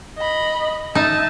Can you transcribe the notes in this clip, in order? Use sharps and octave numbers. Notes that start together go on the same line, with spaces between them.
D#5 B5
D#4 E5 A5